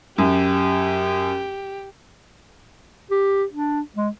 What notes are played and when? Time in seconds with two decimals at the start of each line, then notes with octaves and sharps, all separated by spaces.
0.18 F#2 G4
3.11 G4
3.53 D4
3.96 G#3